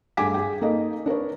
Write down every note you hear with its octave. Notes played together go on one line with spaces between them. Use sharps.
G2 A3 G#4 G#5 D6 B6
G#4 G5
A#3 D#4 A4 D#5
D4 A#4 B4 C#5